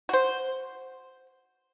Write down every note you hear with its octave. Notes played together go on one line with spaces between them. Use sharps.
F#4 C5